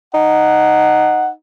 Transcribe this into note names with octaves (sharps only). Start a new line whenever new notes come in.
D#4 F#5